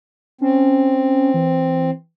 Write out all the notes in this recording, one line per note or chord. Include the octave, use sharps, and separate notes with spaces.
C4 C#4
E3